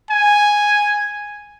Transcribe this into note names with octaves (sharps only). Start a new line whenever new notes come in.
G#5